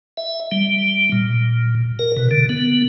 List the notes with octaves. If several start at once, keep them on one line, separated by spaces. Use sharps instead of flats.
E5
G3
A#2
A#4
B2
D3
B3